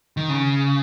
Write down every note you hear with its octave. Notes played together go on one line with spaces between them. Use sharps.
D#3
C#3